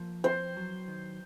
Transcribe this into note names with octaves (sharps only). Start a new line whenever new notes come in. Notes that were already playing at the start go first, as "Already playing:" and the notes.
Already playing: F3 A#3
C4 C5
F#3
D#3